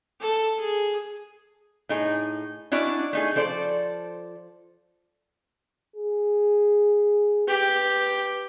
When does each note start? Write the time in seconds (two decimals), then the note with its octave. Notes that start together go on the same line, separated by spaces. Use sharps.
0.21 A4
0.60 G#4
1.89 A2 D#4 G#4
2.72 C#4 D4 E4 F#4 D5 D#5
3.13 A3 D#4 G#4
3.35 F3 A4 C5 D5
5.96 G#4
7.48 G4 B4